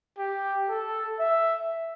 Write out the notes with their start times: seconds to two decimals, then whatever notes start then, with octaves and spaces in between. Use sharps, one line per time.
0.18 G4
0.69 A4
1.20 E5